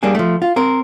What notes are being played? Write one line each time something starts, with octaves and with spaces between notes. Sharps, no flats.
G3 A#3 D4 G#4
F3 A3
F4
C4 A#4